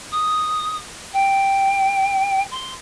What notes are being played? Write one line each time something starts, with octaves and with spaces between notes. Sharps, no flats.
D#6
G5
C6